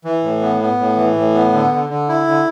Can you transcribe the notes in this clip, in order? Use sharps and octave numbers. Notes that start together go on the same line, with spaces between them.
E3
A2
B3
B3
A2
E3
A2
B3
D3
D3
D3
E4
D3